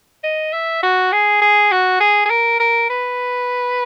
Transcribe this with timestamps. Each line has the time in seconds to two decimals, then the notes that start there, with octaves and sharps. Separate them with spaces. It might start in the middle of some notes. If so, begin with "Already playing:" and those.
0.24 D#5
0.53 E5
0.83 F#4
1.12 G#4
1.41 G#4
1.71 F#4
2.00 G#4
2.26 G#4
2.30 A#4
2.59 A#4
2.90 B4